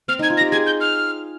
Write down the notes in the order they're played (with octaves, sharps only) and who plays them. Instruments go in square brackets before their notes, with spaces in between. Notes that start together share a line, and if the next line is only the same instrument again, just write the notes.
[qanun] C4 [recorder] F6
[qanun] D#4 [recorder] G#6
[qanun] F4
[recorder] A#6
[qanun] G4
[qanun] G#4 [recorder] G#6
[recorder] G6
F6